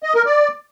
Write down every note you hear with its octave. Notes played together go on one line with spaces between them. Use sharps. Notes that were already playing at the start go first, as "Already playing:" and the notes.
D#5
A#4
D5